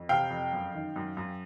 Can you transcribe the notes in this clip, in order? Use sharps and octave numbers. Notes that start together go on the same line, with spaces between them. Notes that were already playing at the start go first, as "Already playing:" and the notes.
Already playing: F2
C3 F5 G5
F2
F#2
D#3
F#2
F#2